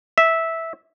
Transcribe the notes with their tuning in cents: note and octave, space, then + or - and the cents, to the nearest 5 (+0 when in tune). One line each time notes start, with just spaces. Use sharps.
E5 -10